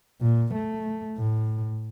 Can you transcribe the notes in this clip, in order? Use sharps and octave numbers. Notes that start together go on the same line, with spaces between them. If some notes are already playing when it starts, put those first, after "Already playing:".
A#2
A3
A2